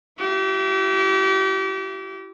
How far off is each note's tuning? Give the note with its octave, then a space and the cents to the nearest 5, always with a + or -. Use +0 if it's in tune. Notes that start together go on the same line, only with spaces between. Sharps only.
E4 +35 G4 -35